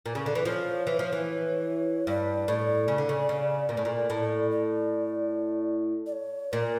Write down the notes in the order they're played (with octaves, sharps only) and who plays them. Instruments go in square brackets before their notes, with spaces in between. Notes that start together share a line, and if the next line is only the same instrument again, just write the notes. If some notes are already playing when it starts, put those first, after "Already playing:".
[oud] A#2
C#3
D3
E3
[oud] F3 [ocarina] C#5
[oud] E3
F3
E3
[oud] G2 [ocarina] D5
[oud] A2
C#3
D3
C#3
C#3
A#2
A2
A#2
A2
[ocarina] D5
D5
C#5
[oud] A#2 [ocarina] A#4